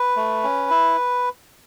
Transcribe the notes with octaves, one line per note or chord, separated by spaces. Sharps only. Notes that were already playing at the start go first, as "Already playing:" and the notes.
Already playing: B4
A3
C#4
E4